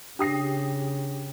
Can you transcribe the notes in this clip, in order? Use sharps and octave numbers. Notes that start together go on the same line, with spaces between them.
C#3 D4 G4 D#6 A#6 C7